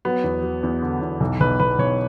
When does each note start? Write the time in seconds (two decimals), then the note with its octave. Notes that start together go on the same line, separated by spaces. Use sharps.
0.05 F#3 B3
0.24 E2
0.43 F#3
0.63 E2
0.82 D3
1.01 E2
1.20 B1
1.40 B1 B4
1.60 B1 B4
1.78 B1 C#5